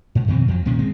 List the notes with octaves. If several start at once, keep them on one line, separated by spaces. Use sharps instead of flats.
G#2
F2 B2 D#3 C4
F2 F3 F#3
C2 A#2 D#3 C#4
G#1 G#3 C4